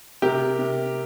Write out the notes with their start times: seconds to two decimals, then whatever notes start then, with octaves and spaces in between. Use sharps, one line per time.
0.22 C3 G4 A#4
0.59 C3